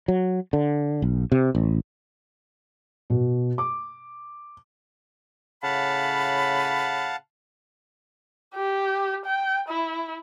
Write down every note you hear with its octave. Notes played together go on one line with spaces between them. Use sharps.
F#3
D3
B1
C3
A1
B2
D6
A2 C#3 F5 F#5 A5 B5
G4
G5
E4